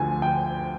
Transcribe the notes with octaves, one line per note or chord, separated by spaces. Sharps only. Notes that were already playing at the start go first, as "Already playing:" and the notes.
Already playing: D2 D3 F3 G#5
G5